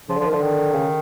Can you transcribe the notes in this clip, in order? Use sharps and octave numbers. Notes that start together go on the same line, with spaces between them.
C#3 F3
D3
F3
D#3
D3 F3
D#3
C#3